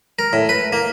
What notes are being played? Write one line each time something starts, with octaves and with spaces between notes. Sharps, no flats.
A#4
A2
B4
A#3